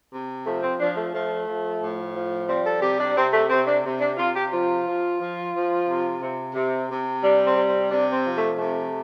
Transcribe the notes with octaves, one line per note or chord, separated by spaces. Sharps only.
C3
F3 A3
C4
F3 D4
A3
F3 A3
F3
A2
F3
G3 C4
A4
C3 G4
D4
C3 C4
A3
C3 C4
D4
C3
D4
C3 F4
G4
F3 F4
F3
F3
F3
C3
C3
C3
C3
G3 D4
C4
C3
C4
C3 D4
C4
F3
A3
C3 A3